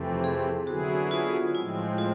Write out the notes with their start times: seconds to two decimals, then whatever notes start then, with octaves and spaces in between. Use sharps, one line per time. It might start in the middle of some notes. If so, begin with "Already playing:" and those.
Already playing: F2 C3 E3 A3 C4 A4
0.24 G#4
0.67 D3 F#3 B3 E4 F#4 G#4
1.11 F4
1.54 A2 F3 G#3 C4 E4
1.98 F4